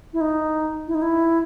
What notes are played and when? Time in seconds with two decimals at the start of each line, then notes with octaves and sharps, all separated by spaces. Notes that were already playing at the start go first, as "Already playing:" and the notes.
0.13 E4
0.21 D#4
0.88 E4
0.95 D#4
1.02 E4